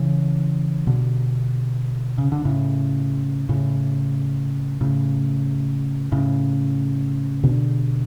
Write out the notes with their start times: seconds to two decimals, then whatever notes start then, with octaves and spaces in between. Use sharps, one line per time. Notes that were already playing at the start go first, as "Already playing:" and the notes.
Already playing: C#3 E3
0.87 B2 D3
2.18 C#3
2.32 D3
2.45 A2 C#3
3.49 A2 C#3
4.81 A2 C#3
6.12 A2 C#3
7.43 B2 D3